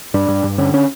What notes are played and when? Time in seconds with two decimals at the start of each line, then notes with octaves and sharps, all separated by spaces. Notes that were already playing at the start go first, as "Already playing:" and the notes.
0.14 G2 D4
0.28 G2
0.44 G2
0.58 D3 C#4
0.74 C#4